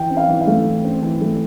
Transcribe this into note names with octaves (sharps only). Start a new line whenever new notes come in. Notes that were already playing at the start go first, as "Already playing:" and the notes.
Already playing: E3 G5
C4
F5
E3
F5
A3
E3
C4
E3
A3